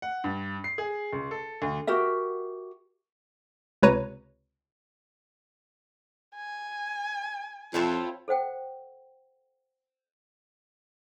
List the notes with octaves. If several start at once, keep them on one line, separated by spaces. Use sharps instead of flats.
F#5
G2
C7
G#4
C#2
A4
D2
F#4 G4 A#4 E5
C#2 C3 B4 C#5 A#5 D#7
G#5
F2 C4 E4 F4 A4 C5 C#5
A4 C5 F#5 G5